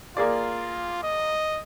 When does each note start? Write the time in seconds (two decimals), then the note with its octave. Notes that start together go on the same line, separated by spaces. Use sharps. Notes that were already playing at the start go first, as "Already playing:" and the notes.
0.17 A#3 F4 G#4 D5
1.03 D#5